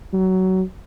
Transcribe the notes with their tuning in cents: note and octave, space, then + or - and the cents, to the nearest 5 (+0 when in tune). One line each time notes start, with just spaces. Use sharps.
F#3 +20